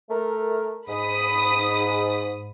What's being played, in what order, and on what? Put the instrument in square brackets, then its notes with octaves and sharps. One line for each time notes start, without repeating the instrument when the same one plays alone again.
[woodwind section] A3 A#4
[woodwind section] G#2 [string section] B5 D#6 B6